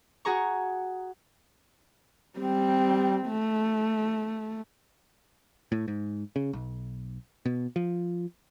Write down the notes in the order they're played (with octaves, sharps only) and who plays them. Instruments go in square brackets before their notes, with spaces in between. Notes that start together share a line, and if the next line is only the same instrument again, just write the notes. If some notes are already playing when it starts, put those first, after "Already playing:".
[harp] F#4 G#4 A#5 C#6
[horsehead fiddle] G3 C4
A3
[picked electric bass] A2
G#2
C#3
B1
B2
F3